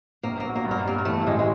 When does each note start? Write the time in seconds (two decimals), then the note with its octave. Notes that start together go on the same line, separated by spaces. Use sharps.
0.23 A#1 A#3
0.40 A#3
0.44 F#3
0.55 A#3
0.65 G2
0.71 A#3
0.85 G3 A#3
0.98 A#3
1.05 E3 A3
1.26 A1 G#3
1.39 G#3